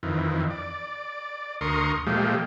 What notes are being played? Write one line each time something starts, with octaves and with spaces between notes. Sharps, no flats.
F2 D#3 E3
D5
D2 A#4 C6 C#6 D#6
A#2 F3 G#3 A3 G4